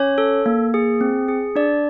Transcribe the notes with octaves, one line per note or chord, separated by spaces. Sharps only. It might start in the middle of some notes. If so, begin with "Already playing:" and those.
Already playing: C#4 C#5
A4
A#3
G#4
C4
G#4
D4 D5